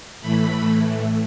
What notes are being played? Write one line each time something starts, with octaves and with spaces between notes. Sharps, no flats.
A2 E3 A3 B5